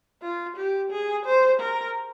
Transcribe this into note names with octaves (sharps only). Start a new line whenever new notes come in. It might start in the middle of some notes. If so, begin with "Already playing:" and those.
F4
G4
G#4
C5
A#4